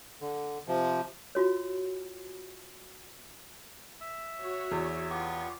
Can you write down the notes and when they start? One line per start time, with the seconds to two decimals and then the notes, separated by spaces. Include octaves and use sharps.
0.21 D3
0.68 C3 F3
1.35 F4 F#4 C#5
4.01 E5
4.39 F#4 C#5
4.71 E2
5.10 B3 F4 G4 C#6